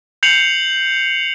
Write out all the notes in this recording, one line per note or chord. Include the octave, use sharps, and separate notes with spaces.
G6 C7 C#7 F7 F#7